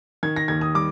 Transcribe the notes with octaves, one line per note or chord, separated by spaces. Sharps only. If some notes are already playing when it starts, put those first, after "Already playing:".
D#3 G#6
A#6
D#2 G#6
D#6
G3 D6